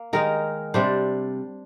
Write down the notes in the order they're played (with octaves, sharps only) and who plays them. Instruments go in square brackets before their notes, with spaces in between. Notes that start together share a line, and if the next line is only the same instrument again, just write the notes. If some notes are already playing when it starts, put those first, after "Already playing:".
Already playing: [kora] A#3
D#3 G#3 D#4 A#4
C3 G3 D4 C5